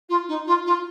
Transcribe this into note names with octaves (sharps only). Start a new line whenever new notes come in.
F4
D#4
F4
F4